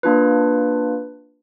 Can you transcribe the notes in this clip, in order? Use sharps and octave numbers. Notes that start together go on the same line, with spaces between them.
A#3 D4 F4 B4